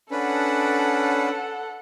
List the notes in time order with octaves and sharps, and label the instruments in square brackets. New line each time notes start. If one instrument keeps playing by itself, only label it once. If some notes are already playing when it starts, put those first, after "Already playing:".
[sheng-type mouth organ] C#4 D4 B4 [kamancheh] A4 F#5